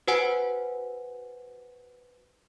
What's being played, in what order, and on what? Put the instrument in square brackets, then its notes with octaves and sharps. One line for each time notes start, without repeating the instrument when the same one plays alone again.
[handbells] F#4 B4 C5 F#5 G#5 D7